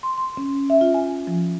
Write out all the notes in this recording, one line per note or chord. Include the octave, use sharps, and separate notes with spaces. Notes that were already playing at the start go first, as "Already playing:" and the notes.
C6
C6
C#4
E5
F4
G#5
F3